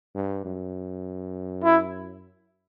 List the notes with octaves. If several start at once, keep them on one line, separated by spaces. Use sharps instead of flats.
G2
F#2
E4